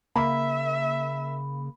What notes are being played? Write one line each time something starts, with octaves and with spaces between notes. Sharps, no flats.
C#3 A#3 E5 B5